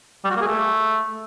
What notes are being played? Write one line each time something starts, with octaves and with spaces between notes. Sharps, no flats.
G3
F#4
A#3
G#4
A3